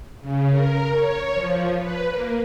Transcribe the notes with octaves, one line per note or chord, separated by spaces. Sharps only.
C#3
A#4
C#5
F3
B4
A#3